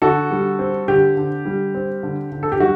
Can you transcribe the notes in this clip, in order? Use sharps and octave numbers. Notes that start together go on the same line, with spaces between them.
D3 F#4 A4
G3
C4
D3 G4
D3
G3
C4
D3
D3
A4
G4
G3 F#4